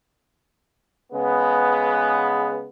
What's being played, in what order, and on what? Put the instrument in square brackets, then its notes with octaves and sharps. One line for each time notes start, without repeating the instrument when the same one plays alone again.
[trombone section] C#3 G#3 B3